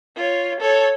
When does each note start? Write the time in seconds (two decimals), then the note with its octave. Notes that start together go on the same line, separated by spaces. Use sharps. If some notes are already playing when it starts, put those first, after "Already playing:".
0.16 F4 C#5
0.60 A4 C#5